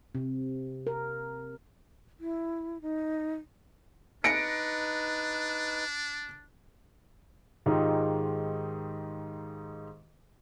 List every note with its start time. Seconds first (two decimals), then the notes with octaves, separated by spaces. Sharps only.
0.15 C3
0.87 A#4
2.20 E4
2.82 D#4
4.24 D4 D#4 B4 A#6 C#7 D7
7.66 G#2 D#3 G#3 D#4 F4 G4